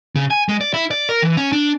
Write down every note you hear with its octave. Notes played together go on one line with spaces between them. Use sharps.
C#3
G#5
G#3
D5
E4
D5
A#4
E3
C#4
D4